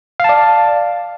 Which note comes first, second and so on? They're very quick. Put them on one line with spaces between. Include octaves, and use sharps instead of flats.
F5 A5 D5